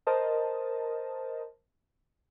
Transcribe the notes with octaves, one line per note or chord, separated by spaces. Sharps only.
A#4 C5 D#5 A5